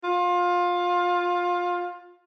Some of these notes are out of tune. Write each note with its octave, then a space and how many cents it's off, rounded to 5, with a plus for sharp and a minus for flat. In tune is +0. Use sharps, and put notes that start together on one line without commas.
F4 +20